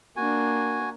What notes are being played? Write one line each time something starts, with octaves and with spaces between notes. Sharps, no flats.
A#3 D4 F#4 G#5